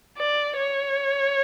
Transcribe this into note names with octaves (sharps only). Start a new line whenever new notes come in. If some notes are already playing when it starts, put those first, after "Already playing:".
D5
C#5